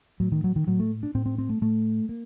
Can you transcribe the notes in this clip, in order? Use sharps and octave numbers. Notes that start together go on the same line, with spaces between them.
A2 F#3
D#3
F#3
D#3
A2 F#3
A3
D4
A2 C4
C4
C4
A3
A2 A3
A#3